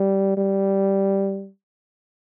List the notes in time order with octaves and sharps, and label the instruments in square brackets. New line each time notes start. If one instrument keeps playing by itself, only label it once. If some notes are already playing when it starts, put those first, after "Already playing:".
Already playing: [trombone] G3
G3